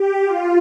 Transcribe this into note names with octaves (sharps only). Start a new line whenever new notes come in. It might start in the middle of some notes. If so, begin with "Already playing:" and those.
Already playing: G4
F4